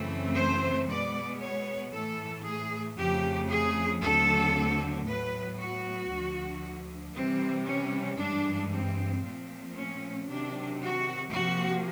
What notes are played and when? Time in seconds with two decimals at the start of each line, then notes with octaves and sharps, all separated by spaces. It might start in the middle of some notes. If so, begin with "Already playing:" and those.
Already playing: F#2 C#3 E3 A3 C4
0.37 C5
0.88 B2 G#3 B3 D5
1.41 C#5
1.93 A2 E3 A3 A4
2.45 G#4
2.98 F2 C#3 F3 A3 G4
3.50 G#4
4.02 D#2 D3 F#3 A3 C4 A4
5.06 A2 F#3 B3 B4
5.59 F#4
6.10 D2 D3 F3
7.15 C3 E3 G3 C4
7.67 C#4
8.19 G2 E3 G#3 D4
8.71 C4
9.23 A#2 F3 A3 C4
9.76 C#4
10.28 C3 D#3 F#3 D4
10.80 F#4
11.32 C3 F3 A#3 F#4